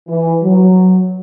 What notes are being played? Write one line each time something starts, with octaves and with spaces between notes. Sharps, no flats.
E3
F#3